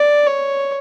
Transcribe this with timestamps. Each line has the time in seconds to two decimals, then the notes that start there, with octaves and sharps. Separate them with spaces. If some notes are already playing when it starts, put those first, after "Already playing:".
Already playing: D5
0.27 C#5